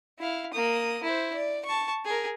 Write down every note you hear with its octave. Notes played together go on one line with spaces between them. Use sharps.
E4 F5
A#3 D#6
E4 C5
D5
A5 C#6
G#4 A#4